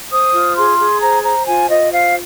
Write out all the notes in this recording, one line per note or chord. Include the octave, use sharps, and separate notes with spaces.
C5 D#6
F4
G#4 C6
G#4
C5 A#5
C5 A#5
F4 G#5
F4 D#5
C5 F5